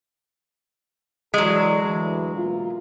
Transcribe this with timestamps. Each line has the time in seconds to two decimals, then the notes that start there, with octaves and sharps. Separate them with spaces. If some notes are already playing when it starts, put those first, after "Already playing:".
1.34 E3 F#3 G#3 A4 D5
1.83 D2 E3
2.35 B2 A#3 F4